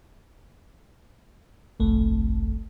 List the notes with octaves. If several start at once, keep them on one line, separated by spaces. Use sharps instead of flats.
G1 C2 F2 A3